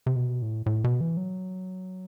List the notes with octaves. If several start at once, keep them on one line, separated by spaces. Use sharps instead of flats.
C3
B2
A2
A2
B2
E3
F#3